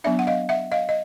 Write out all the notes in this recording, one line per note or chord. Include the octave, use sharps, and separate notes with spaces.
F#3 B3 D4 D5 E5
F#5
D#5 F5
E5 F#5
D#5 F5
D#5